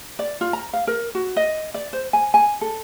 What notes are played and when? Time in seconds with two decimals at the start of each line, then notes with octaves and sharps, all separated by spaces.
0.19 D5
0.41 F4
0.53 A#5
0.73 F5
0.87 A#4
1.15 F#4
1.36 D#5
1.74 D5
1.93 C5
2.13 G#5
2.34 G#5
2.61 A4